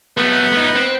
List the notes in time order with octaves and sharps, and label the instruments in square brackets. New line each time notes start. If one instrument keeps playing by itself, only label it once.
[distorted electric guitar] F#3 A3 [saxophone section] B3
[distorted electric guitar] A3 D#4
C4